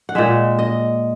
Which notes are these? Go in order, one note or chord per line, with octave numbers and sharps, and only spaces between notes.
F#5
A#2 G#3 E5
D#5